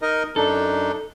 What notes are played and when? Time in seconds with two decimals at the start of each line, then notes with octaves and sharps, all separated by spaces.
0.02 D#4 A#4 D#5
0.36 F#2 D4 D#4 A4